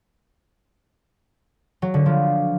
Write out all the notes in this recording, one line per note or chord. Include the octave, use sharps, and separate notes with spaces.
F#3
D3
F3